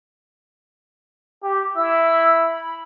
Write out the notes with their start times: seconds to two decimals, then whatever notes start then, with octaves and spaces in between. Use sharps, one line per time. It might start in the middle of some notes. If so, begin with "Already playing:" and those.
1.43 G4
1.76 E4 E6
2.44 B5